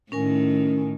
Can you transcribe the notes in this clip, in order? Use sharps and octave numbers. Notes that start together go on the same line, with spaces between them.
A2 D#3 C#4 A#4 G#5